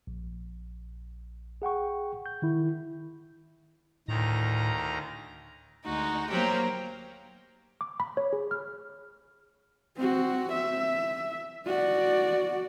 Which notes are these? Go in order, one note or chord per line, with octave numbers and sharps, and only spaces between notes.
A#1
G#4 F#5 G5 C#6
G6
D#3 E4
D2 A2 D#3 A#5
D2 G#3 D#4 F#4
F#3 A#3 G4 A#4 C5 C#5 A#5
D6
B5
C#5
G#4
F6
C4 F#4
E5
F#4 D5